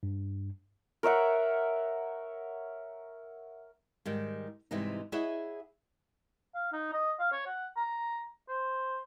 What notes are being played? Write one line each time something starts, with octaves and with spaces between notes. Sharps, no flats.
G2
A#4 C#5 E5 F#5
G#2 D#3 G3
G#2 C3 E3 G3 D#4
E4 G#4 C#5 D#5 E5 F#5
F5
D#4
D#5
F5
C#5
F#5
A#5
C5